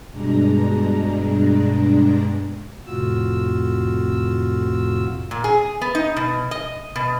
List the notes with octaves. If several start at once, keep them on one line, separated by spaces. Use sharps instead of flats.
G2 B2 G#3 D4 A#5
F2 A2 C3 F4 F#4 E6
A#2
G#4
B3
D#4
B2
D#5
B2